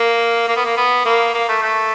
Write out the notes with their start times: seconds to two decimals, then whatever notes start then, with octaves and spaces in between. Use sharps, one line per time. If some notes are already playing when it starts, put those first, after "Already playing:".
Already playing: A#3
0.48 A#3
0.57 B3
0.65 A#3
0.77 B3
1.05 A#3
1.34 A#3
1.49 A3
1.63 A3